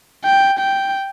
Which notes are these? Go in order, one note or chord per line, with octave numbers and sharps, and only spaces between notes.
G5
G5